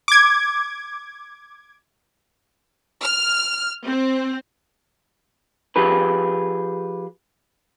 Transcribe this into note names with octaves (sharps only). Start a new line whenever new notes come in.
D6 G#6
F6
C4
F3 G4 G#4 B4